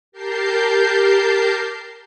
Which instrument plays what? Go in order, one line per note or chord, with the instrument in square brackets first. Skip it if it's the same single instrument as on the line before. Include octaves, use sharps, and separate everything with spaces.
[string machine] G4 A#4 A5 G6 C7